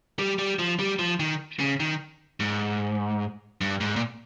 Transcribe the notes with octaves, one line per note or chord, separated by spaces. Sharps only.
G3
G3
F3
G3
F3
D#3
C#3
D#3
G#2
G2
G#2
A#2